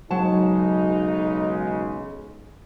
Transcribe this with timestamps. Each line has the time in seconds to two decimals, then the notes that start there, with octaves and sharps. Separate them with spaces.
0.11 B1 C#3 F#3 G#3 D#4 A5